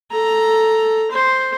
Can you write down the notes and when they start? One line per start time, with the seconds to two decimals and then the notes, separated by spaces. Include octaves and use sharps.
0.11 A4 A#5
1.11 C5